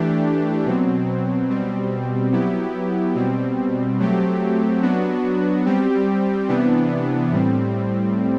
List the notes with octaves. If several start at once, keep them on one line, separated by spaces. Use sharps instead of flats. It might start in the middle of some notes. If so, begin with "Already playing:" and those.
Already playing: E3 A3 D4 G4
B2 F#3 C4
B2 G3 C4
F#3 B3 E4 G4
B2 G3 C4
F#3 A3 C4 G4
F#3 B3 D4 F#4
G3 C4 G4
C3 E3 B3 D4
A2 G3 C4